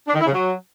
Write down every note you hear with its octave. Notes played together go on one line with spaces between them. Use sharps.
D4
D#3
E4
C#3
F#3